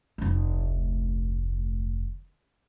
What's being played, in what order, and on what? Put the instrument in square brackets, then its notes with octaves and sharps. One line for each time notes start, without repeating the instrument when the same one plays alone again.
[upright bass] F1 D2